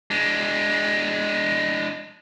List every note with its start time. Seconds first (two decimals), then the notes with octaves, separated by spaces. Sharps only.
0.11 G#3 D4